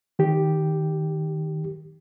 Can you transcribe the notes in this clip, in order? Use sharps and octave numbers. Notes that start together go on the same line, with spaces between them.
D#3 G4